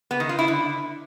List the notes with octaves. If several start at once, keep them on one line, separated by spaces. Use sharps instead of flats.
B3
D#3
F4
E4
D3